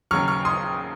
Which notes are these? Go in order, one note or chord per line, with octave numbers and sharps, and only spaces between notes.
D#2 C#3 F#3 C#6 F6
C#6 F6
C6 D#6